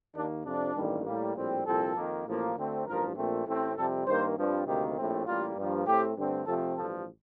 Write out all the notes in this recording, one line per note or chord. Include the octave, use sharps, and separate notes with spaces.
D#2 D#3 A#3 D4
F2 C3 F3 D4
A1 G2 D#3 G3 A#3
A2 G3 A#3
A#1 A2 G3 C4
C2 A#2 F3 C4 A4
F2 D#3 A#3
A1 A2 F3 A#3
D2 D3 A3 C4
A1 G2 F3 A#4
A#1 A#2 A3 C4
A1 A2 A3 C4
F2 C3 G3 C4 A4
G2 D#3 A#3 C5
G2 F3 C4
D2 C3 D#3 G3 A#3 G4
A#1 A2 A3 C4
A1 A2 G3 A#3 F4
G2 F3 A#3
A2 A3 C4 G4
G2 D3 A3 C4
F2 C3 F3 A3 C4 A4
A1 G2 F3 A4